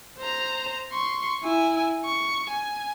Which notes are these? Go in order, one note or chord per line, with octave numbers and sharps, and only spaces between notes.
C5 A#5
C6 C#6
E4 G#5
C#6
G#5